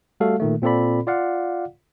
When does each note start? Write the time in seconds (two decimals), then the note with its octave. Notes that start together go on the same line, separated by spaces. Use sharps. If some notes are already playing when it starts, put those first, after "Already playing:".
0.20 G3 A3 F#4 A4 F5
0.40 A#2 D#3 A3
0.62 A#2 C4 F4 A4 D5 B5
1.07 F4 D5 F5 F#5